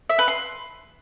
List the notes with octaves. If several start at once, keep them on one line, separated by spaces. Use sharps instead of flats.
E5
B4
C6